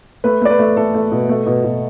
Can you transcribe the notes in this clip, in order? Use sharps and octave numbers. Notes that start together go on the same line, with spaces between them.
A3 B4
A3 D5
B4
A3
A3 A4
A3
B2
A3
B2
B2